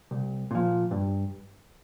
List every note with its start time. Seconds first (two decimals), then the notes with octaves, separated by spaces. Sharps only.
0.11 C2
0.51 A#2 F3
0.91 G2